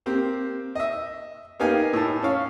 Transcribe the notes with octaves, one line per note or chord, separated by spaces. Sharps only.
A#3 C4 G4
D#5 E5
A#3 B3 D#4 G4 F5 G#5
A2 A5
C#4 F5